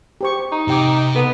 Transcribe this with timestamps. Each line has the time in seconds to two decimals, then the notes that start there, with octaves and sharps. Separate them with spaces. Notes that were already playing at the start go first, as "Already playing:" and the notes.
0.21 G4 C5 C#6
0.52 D#4
0.68 C3 G4 G5 D6
1.15 B3 A4 F#5 D#6